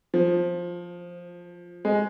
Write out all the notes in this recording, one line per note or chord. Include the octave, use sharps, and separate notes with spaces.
F3
G#3